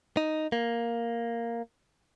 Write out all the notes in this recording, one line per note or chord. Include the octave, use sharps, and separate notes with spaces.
D#4
A#3